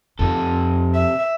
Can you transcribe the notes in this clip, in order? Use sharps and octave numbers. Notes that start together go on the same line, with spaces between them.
F2 C3 A4
E5